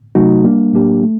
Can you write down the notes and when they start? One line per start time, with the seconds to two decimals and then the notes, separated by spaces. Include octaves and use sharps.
0.15 C3 F#3 A3 D#4 F#4
0.44 G3 A#3 D4
0.73 A2 F#3 A#3 D4 G4
1.03 A3